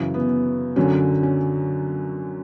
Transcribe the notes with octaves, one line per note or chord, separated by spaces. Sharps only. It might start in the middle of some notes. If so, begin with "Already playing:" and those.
Already playing: F#2 C#3 E3
B3
F#2 D3 F#3 C#4
C#4